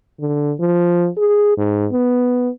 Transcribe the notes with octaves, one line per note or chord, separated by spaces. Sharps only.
D3
F3
G#4
G#2
B3